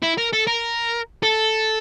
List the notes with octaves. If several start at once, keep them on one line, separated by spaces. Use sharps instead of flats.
E4
A#4
A4
A#4
A4